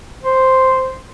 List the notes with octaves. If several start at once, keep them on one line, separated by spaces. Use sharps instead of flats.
C5